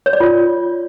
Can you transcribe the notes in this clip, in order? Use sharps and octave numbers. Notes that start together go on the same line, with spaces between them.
C#5
D5
F4